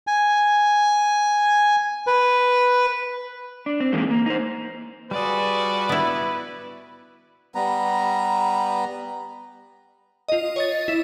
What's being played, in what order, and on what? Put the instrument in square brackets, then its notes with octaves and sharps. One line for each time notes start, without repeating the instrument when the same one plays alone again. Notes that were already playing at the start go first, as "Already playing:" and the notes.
[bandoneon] G#5
B4
[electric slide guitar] D4
C4
D3 E3 G#3 A#3 D#4
A#3
D#4 C5
[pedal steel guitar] G3 F4 G#4 [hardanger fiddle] F#4 D5 [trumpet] B4
[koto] B3 E4
[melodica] G3 B3 A#5
[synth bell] F4 D#5
C#5 D#5 A6
E4